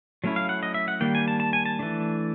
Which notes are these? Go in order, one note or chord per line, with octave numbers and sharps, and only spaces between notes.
F#3 A3 C#4 E4
F5
F#5
D#5
E5
F#5
D#3 G3 A#3 G5
G#5
A5
A5
G#5
A5
E3 A3 D4